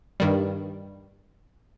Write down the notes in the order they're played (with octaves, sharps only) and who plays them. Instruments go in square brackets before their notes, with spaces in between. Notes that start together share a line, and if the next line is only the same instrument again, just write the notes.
[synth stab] G2 D#3 G3